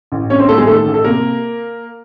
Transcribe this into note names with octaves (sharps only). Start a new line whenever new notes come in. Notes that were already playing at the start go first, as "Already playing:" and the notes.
A1
G2 C#4 C#5
C4 C5
A1 A3 A4
G#3 G#4
D#3 A3 A4
A1
A4
C3 A#3 A#4